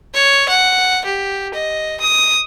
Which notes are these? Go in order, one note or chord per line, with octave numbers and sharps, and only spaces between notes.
C#5
F#5
G4
D#5
D#6